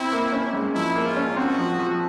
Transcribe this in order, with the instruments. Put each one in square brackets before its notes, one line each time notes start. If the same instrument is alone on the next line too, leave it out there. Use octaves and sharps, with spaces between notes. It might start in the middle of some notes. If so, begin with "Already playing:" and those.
Already playing: [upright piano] C4 [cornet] E4
[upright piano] A#3
C#4
G#2
[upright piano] F3 [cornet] E4
[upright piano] A#3
[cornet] F4
[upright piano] C#4
[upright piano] C4 [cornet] F#4
[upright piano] F3
F3